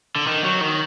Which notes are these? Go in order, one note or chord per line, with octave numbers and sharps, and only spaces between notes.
D3
D#3
F#3
D#3